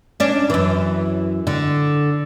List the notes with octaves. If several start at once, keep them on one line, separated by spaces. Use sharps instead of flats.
C#4 D4
F#2 E3
D3